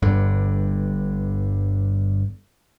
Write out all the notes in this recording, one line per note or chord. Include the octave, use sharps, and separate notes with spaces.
G1 G2 D3